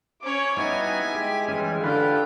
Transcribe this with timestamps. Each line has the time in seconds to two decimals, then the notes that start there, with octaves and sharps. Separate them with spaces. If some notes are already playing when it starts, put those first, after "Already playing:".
0.22 C#4 C#5 D6
0.57 G3 B3 D#4 E4 F#4 G#5
1.15 G#3 G4
1.48 E3 G3 C#4
1.84 D3 E4 F4 G4 B4 F5 G5